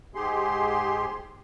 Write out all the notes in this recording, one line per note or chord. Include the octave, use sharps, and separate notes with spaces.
G#2 G4 G#4 C6